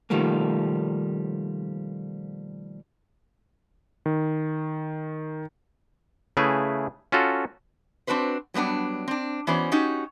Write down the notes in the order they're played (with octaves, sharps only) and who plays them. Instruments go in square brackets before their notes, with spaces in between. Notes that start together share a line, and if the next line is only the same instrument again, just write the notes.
[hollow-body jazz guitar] B2 D#3 F3 G3 A3 A#3
[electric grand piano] D#3
[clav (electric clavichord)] C#3 A3 E4 G#4 B4
C#4 F4 F#4 A4
[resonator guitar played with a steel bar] C4 D4 F#4 B4 C5
F#3 G3 B3 D4 F#5
C4 D4
E3 B3 C#4 F#4 C5 D5
C#4 D#4 F#4 G4